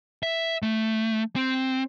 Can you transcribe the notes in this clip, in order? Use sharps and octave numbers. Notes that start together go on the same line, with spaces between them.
E5
A3
C4